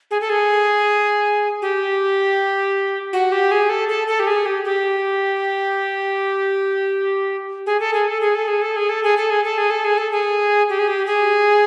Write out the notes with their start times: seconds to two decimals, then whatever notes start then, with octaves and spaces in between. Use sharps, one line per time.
0.11 G#4
0.21 A4
0.30 G#4
1.62 G4
3.13 F#4
3.32 G4
3.51 G#4
3.69 A4
3.89 A4
4.08 A4
4.20 G4
4.27 G#4
4.46 G4
4.64 G4
7.66 G#4
7.80 A4
7.93 G#4
8.08 A4
8.21 G#4
8.35 A4
8.48 G#4
8.62 A4
8.76 G#4
8.89 A4
9.03 G#4
9.17 A4
9.30 G#4
9.44 A4
9.58 G#4
9.70 A4
9.85 G#4
9.98 A4
10.12 G#4
10.69 G4
10.79 G#4
10.88 G4
11.06 G#4